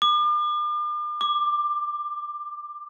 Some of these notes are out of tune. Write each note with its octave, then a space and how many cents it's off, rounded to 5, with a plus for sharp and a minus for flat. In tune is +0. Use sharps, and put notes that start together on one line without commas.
D6 +40
D6 +15